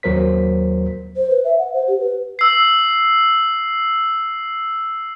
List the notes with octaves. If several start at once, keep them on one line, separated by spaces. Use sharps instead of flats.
D#2 F#3 A#4 C5 B6
C5
B4
E5
F#5
C5
G4
B4
E6 C7